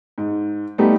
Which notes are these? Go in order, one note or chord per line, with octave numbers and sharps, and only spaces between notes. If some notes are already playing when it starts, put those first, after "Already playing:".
G#2
G3 A3 B3 D#4 G4